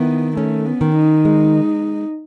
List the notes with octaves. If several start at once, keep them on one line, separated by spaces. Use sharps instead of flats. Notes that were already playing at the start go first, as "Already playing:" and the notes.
Already playing: D#3 B3 E4
A3 C#4
B3
D#3
D#4
G#3